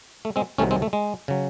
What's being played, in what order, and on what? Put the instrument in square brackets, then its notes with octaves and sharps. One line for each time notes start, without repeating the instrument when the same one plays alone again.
[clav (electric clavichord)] A3
G#3 C4
C2 C3 D#3 F#3 A3 C#4
G#3 C4
A3
G#3
C#3 F#3